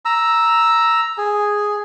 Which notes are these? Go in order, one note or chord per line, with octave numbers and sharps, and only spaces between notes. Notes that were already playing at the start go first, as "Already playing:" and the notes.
A#5 E6
G#4